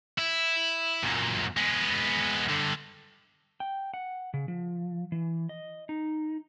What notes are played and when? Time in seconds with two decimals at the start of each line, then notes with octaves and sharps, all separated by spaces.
0.18 E4
1.03 F#2 A#2
1.57 G#3 B3
2.49 G2 D3
3.60 G5
3.94 F#5
4.34 C#3
4.48 F3
5.12 E3
5.49 D#5
5.89 D#4